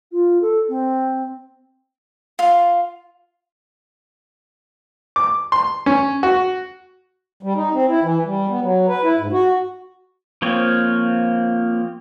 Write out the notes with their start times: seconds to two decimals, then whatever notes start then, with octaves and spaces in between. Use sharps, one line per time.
0.12 F4
0.42 A4
0.69 C4
2.39 F4
5.16 D6
5.52 C6
5.86 C#4
6.23 F#4
7.43 G3
7.56 D#4
7.73 C4
7.88 E4
8.02 E3
8.25 G3
8.49 B3
8.61 F#3
8.88 B4
9.03 E4
9.18 G#2
9.32 F#4
10.42 F3 A#3 C4 C#5